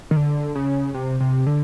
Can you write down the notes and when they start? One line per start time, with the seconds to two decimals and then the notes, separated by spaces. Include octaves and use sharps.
0.11 D#3
0.16 D3
0.55 C#3
0.94 C3
1.21 C3
1.47 D3